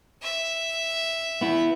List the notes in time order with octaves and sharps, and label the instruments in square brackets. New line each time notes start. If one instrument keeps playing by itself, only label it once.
[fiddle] E5
[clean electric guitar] B3 E4